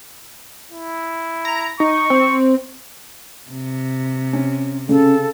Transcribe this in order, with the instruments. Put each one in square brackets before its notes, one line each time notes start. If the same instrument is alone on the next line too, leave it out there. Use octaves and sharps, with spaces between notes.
[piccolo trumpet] E4
[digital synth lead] A#5
[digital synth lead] D#4 [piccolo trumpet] C#6
[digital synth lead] C4
[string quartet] C3
[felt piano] C#4
[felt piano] C#3 [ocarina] C#4 [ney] A4